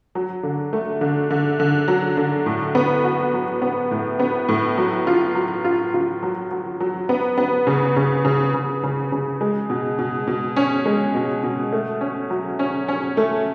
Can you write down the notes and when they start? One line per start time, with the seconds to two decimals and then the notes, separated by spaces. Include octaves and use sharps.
0.15 F#3
0.43 D3
0.73 A3
1.01 D3
1.31 D3
1.60 D3
1.88 F#3
2.17 D3
2.46 A2
2.75 B3
3.04 F#4
3.34 F#3
3.62 B3
3.91 A2
4.19 B3
4.49 A2
4.78 F#3
5.07 F4
5.35 F#3
5.65 F4
5.94 F4
6.23 F#3
6.51 F#3
6.80 F#3
7.09 B3
7.38 B3
7.67 C#3
7.96 C#3
8.25 C#3
8.54 C#3
8.83 C#3
9.12 C#3
9.41 G#3
9.70 B2
9.99 B2
10.28 B2
10.56 C#4
10.86 G#3
11.15 B2
11.44 B2
11.72 A3
12.01 C#4
12.30 F#3
12.59 C#4
12.88 C#4
13.17 A3